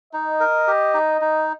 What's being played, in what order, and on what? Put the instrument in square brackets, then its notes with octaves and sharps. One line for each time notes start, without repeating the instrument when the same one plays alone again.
[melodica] D#4 [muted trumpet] D#5
[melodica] A#4
G4
D#4
D#4